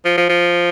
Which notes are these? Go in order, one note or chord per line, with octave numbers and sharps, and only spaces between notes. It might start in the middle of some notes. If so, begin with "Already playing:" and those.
F3
F3
F3